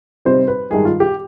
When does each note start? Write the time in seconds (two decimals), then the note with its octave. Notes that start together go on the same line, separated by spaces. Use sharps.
0.25 C3 G3 C4 D#4 C5
0.48 B4
0.70 G2 D#3 G#3 G#4
0.85 F4
1.00 G4